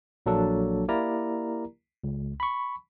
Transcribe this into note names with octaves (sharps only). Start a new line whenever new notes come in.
A#1 F#3 A#3 D4 A4
A#3 E4 G4 A#4 D5 A#5
C#2
B5 C#6